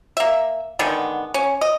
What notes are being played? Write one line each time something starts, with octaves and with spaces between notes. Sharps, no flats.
A#3 E5
D3 D#3 G#3 B3
C#4
D#5